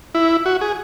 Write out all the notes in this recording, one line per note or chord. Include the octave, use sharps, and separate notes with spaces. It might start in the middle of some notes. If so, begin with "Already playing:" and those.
E4
F#4
G#4